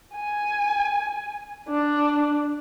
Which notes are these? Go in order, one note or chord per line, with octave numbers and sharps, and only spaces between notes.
G#5
D4